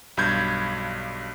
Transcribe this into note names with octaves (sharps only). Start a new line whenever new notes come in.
B1 G2 B5 G6 G#6